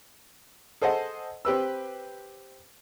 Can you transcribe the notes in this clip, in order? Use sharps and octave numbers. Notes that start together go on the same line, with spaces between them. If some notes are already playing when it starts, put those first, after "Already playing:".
G#4 A4 C5 D#5 F#5
C4 G4 B4 E6